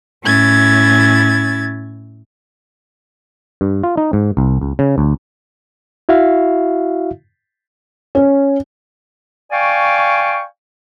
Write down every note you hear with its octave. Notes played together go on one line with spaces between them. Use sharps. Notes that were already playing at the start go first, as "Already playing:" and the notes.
A2 C#4 E4 G#6 A6
G2
F4
D#4
G#2
C2
C#2
C#3
D2
E4 F#4 E5 F5
C#4
D5 F5 G5 G#5 C#6